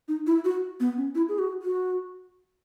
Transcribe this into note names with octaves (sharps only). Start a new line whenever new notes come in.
D#4
E4
F#4
B3
C#4
E4
G#4
F#4
F#4